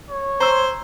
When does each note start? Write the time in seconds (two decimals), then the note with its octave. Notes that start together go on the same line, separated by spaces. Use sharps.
0.10 C#5
0.40 C5 A#5 C6 E6